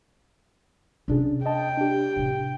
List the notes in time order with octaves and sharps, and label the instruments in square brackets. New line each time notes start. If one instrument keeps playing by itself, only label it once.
[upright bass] C3 F4 [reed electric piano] C#4 D4 G#4
[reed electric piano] D#5 A5 [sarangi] G5
[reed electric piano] D4 G4
[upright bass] A2 C3